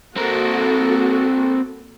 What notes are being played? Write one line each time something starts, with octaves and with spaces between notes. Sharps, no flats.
A#3 C4 F#4 A4 A#4